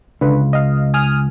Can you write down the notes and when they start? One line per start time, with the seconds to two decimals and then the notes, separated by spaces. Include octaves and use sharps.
0.21 C#2 D3 B4
0.53 D#5 F5
0.94 G#5 D#6 F6